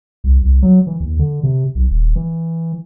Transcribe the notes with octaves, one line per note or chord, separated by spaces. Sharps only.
C2
C2
F#3
E3
D#2
D3
C3
B1
D#1
E3